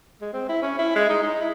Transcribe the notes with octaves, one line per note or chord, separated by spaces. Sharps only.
G#3
C4
E4
C#4
E4
G#3
D#4
D#4
E4